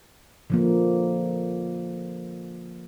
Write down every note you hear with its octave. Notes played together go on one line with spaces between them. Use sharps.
D3 F3 A#3